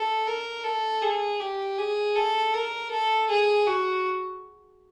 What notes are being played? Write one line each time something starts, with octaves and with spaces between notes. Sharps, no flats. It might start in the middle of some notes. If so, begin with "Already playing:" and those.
Already playing: A4
A#4
A4
G#4
G4
G#4
A4
A#4
A4
G#4
F#4